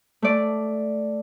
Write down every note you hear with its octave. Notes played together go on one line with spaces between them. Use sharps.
A3 D5